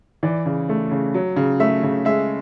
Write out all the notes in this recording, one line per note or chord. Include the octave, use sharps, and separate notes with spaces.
E3 D5
C#3
A3
C#3
F#3
C#3
A3 E5
C#3
G#3 E5